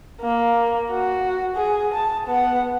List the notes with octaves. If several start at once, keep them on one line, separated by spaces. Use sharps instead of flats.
A#3
F#4
G#4
A5
B3 F#5